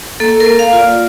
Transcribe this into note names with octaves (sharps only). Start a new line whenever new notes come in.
A#3 A4
A#4
A#3
F5
F4
D5